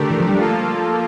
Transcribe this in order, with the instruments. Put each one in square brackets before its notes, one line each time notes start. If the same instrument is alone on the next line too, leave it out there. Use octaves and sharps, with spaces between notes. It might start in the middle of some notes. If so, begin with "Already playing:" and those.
Already playing: [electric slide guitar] D3 [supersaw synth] A3 D4 G4 A#4 D5
[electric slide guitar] E3
F3
G3
[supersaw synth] F3 A#3 F4 A4 [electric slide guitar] A3